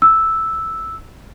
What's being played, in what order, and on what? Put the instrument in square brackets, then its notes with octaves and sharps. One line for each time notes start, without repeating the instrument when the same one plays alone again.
[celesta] E6